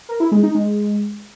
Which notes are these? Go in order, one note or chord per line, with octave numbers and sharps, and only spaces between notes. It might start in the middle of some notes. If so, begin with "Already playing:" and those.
A#4
E4
G#3
D#4
G#3